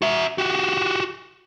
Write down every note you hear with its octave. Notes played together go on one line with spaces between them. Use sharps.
F#4 E5
F#4 G4